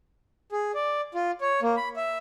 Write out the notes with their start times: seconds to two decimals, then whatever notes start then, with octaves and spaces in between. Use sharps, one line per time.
0.52 G#4
0.75 D5
1.15 F4
1.41 C#5
1.62 A#3
1.77 B5
1.96 E5